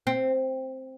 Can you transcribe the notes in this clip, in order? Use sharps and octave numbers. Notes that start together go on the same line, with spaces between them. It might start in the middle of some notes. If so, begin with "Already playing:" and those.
C4